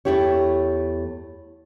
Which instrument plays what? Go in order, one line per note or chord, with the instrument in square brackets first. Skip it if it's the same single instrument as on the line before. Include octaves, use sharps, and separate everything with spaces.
[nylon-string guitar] E2 B2 A3 E4 G4 C#5